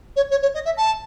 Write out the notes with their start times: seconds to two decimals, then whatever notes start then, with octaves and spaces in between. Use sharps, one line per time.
0.16 C#5
0.30 C#5
0.42 C#5
0.54 D#5
0.65 E5
0.77 A5